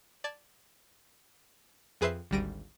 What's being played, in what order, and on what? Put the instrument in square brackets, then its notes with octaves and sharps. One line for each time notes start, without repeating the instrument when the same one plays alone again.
[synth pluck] D5 A5 G#6 E7
F2 G#4 B4 C5 E5 C7
G#1 D2 G3 A#6 D7 D#7